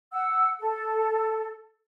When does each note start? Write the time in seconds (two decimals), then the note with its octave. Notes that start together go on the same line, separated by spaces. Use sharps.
0.12 F#5 E6
0.59 A4